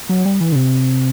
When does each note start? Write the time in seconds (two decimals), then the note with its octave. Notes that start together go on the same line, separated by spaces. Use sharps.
0.09 F#3
0.25 G3
0.41 E3
0.52 D3
0.55 C3